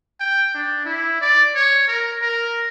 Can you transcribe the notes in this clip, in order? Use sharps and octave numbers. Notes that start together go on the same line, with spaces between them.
G5
D4
E4
D5
C#5
A#4
A#4